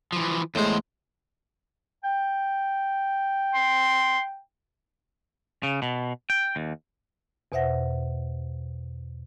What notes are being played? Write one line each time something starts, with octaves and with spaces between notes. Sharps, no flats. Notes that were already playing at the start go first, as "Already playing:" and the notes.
E3 F3
E2 A2 G#3 C5
G5
C6
C#3
B2
G5
D#2
E2 B2 C5 E5 F#5 A#6